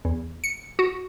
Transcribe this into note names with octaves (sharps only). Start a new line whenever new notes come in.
E2
C#7
F#4